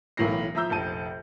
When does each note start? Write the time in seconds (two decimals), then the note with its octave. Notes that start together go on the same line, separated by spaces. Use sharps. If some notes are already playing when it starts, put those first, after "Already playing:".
0.17 B1 A2 E3 A#4 A#6 C7
0.55 F3 E5 A#5 E6 G6
0.70 F1 A#1 A5 D#7